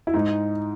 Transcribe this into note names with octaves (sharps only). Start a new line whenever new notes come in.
E4
G#2 D#4